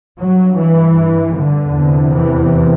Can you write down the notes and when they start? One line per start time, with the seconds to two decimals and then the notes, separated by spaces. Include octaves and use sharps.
0.20 G2 F#3
0.58 E3
1.36 D3
1.74 E2 C3
2.13 E3